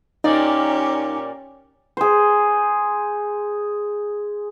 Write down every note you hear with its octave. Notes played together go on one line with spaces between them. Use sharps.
A#2 A#3 C#4 D#4 G4 D5
G#4 C5